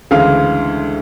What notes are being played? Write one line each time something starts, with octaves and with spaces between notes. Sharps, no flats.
D2 C#3 E3 G#3 F5